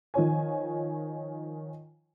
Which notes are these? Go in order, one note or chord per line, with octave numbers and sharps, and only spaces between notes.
D#3 F3 C#5 G#5